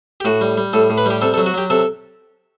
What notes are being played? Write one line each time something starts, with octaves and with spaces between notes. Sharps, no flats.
G4
A2 F#4
G3
G3
A2 A4
A2
B4
G3 G4
C3 A4
A4
F#3
F#4
F#3 G4
C3 A4